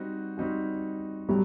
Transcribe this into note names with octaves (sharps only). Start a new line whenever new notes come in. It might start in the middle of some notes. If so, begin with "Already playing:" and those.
Already playing: G3 C4 D#4 F#4
G3 C4 D#4 F#4
A2 F#3 G3